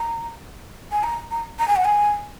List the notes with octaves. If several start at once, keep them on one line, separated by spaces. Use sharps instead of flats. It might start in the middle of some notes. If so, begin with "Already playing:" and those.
Already playing: A#5
G#5
A#5
A#5
A#5
G#5
F#5
G#5